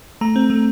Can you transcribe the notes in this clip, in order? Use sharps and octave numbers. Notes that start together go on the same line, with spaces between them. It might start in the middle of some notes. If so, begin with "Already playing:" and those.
A3 A#5
C4
A3